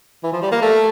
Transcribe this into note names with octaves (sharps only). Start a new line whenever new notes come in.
E3
F3
G3
A#3
A3